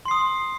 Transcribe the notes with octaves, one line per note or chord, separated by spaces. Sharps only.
C6 D#6 C7